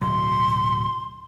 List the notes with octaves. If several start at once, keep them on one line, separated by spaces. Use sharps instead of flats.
D1 B2 F#3 C6